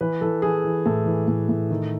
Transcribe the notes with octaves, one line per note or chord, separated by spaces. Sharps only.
E3 B4
E3 A4
E3 G#4
E3
A2 A4
E3
A2
A2
D#3